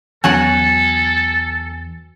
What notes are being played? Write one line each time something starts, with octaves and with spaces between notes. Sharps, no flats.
E2 F#3 F#4 A4 F#5 G#5